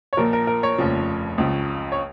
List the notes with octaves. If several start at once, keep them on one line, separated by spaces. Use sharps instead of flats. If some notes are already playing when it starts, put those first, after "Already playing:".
C#5
A#1 A#2 F3 A#4
A#4
A#4
C#5
F1 D#2 C#3 F3
C#2 C#3 F3
C#5